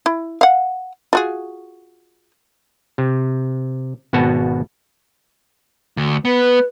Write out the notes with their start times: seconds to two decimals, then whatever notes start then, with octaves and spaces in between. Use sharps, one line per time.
0.06 E4
0.41 F5 F#5
1.13 F4 F#4 G#4
2.98 C3
4.13 G#1 B2 B3 F#4 A5
5.97 D2
6.25 B3 B4